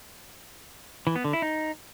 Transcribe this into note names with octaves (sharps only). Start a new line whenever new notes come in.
E3
B3
D3
E4
D#4